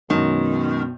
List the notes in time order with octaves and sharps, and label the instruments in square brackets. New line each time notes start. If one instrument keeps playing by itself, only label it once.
[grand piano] F#2 [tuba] B2 [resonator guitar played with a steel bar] D#3 [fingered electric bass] G#3 C#4